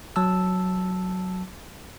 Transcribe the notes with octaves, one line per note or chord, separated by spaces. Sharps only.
F#3 A5 E6